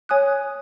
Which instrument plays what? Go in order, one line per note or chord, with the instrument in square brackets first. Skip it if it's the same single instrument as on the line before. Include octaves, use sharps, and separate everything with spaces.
[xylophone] C#5 G#5 D#6 F#6